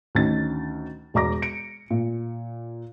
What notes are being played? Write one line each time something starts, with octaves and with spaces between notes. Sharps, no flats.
D2 D#3 C#4 A6
E1 B2 D5 A#5 D6 A#6
C#7 D7
A#2